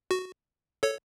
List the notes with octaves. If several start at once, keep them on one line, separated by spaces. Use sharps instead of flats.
F#4
A4 C#5